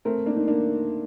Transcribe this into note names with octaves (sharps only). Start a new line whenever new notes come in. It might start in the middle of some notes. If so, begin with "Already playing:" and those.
A3 C4 A#4
A#3 D4
D#4
A#3 D4